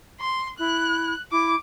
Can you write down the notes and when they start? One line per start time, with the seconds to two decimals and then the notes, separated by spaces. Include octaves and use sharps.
0.20 C6
0.59 E4 F#6
1.32 E4 D6